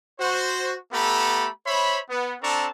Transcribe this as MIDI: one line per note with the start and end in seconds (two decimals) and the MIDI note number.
0.19 0.76 66
0.19 0.76 72
0.93 1.48 57
0.93 1.48 59
0.93 1.48 67
0.93 1.48 69
0.93 1.48 82
0.93 1.48 83
1.66 1.99 72
1.66 1.99 73
1.66 1.99 76
1.66 1.99 83
2.10 2.35 59
2.42 2.68 60
2.42 2.68 62
2.42 2.68 69
2.42 2.68 81
2.42 2.68 82
2.42 2.68 85